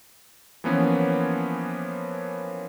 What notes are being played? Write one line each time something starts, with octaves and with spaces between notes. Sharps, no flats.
E3 F3 A#3 B3 C#4